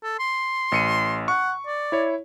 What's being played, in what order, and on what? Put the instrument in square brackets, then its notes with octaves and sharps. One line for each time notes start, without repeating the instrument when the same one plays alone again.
[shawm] A4
C6
[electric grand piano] A1 C#7 D#7
[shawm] F#5 [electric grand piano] C#6
[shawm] D5
[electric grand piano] E4 C#5